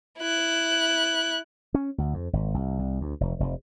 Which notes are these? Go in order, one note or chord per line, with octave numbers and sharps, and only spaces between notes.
E4 F#6
C#4
D2
F2
G#1
C2
C2
D2
F1
F1